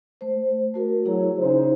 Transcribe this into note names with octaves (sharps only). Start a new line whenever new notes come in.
A3 C5
A3 F#4 A#4
F#3 E4 G#4
C#3 D#4 C5